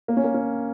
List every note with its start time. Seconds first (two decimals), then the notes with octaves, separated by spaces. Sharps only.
0.08 A#3
0.17 C#4
0.24 A#3
0.34 C#4